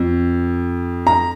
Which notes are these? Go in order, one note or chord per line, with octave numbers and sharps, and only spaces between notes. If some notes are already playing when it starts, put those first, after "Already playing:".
Already playing: F2
A#5